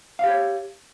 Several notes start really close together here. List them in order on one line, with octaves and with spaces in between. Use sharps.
F5 G4 C#5